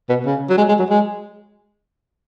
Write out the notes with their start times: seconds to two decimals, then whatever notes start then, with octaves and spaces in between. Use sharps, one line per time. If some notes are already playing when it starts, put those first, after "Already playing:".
0.09 B2
0.25 C#3
0.49 F#3
0.58 G#3
0.68 G#3
0.79 F#3
0.90 G#3